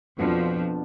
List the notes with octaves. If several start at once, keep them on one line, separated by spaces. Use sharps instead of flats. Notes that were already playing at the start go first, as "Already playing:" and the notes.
F2 B2 F3 B3 D4